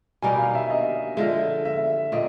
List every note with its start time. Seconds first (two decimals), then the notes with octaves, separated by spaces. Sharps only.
0.22 B2 G3 A#3 D#4 G#5
0.38 F5
0.55 E5
0.70 D#5
1.17 D3 F3 G#3 E5
1.65 E5
2.12 A#2 C4 D#5